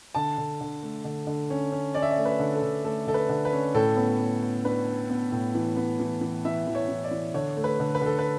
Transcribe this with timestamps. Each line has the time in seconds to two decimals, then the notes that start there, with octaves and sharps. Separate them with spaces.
0.15 D3 A5
0.38 D3
0.61 D3
0.83 A3
1.04 D3
1.27 D3
1.50 C#4
1.72 C#4
1.94 C#4 D5
2.02 E5
2.10 D5
2.18 A3
2.25 B4
2.39 D3
2.55 A4
2.62 D3
2.84 A3 A4
3.07 D3 A4
3.14 B4
3.29 D3
3.45 B4
3.53 C#4
3.74 A2 A4
3.97 B3
4.19 B3
4.42 B3
4.64 D4 B4
4.87 D4
5.10 B3
5.32 A2
5.55 E3
5.77 B3
5.99 E3
6.21 E3
6.45 E3 E5
6.67 E3
6.75 C#5
6.89 E3
7.04 D5
7.11 E3
7.34 D3 C#5
7.57 A3
7.64 B4
7.80 D3
7.95 B4
8.02 D3 A4
8.19 B4